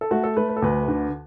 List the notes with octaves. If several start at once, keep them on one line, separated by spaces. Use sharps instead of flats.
A4
A3 F#4
A4
A3 B4
B4
A4
D2 B4
D3